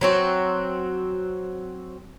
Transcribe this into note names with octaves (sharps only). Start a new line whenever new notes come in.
F#3 C4 F#4